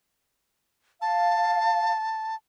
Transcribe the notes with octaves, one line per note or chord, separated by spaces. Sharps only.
F5 A5